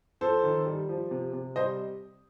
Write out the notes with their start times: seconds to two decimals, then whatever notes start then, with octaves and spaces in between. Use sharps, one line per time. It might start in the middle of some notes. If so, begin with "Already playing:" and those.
0.21 F2 A4 C5
0.44 D#3
0.66 G3
0.89 F3
1.11 C3
1.33 C3
1.56 G3 C5 D#5